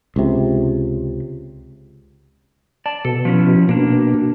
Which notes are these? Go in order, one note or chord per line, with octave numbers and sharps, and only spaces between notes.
C#2 C3
D5 A5
B2 A4
F3 C#4 E4
B2 A#3 D4